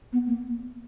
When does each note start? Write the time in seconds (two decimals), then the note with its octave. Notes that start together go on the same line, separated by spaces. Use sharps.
0.13 B3
0.27 A#3